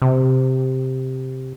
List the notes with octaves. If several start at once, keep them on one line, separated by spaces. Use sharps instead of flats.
C3